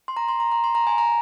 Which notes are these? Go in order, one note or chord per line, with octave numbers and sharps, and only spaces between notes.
C6
A#5
C6
A#5
A#5
C6
A#5
G#5
A#5